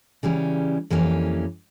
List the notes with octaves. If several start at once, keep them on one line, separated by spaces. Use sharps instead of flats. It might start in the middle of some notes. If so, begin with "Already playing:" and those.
C#3 E3 G3 C#4
F2 E3 G3 A#3 C#4